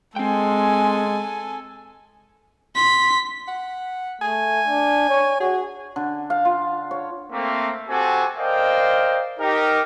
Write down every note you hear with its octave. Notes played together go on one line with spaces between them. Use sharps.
G#3 C4 A4 G5 G#5
C6 B6
F#5
A3 G#5
D4
C#5
F#4 G#4
D3
F5
F4
C#5
A3 A#3 C4
C4 F#4 G4 A4 G#5
A#4 C5 D5 D#5 F5 G5
D#4 G4 A#4